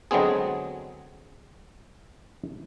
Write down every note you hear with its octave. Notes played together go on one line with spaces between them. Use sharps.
D3 F#3 G#3 B3 C4 G#4